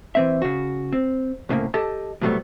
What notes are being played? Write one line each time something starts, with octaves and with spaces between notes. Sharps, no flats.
E3 C4 E5
C#3 F#4
C4
C2 A2 C#3 A#3
G4 A4 D#5 A5
A2 C3 F#3 G3 A3 B3